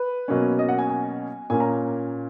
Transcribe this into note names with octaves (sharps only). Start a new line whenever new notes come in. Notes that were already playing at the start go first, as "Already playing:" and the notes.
Already playing: B4
B2 F#3 A#3 C#4
D#5
F#5
G#5
G#5
A#2 A#3 C#4 G#5
A#5